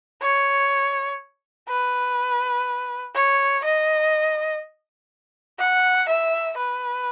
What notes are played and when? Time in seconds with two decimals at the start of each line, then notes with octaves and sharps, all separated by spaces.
0.22 C#5
1.69 B4
3.15 C#5
3.64 D#5
5.59 F#5
6.08 E5
6.57 B4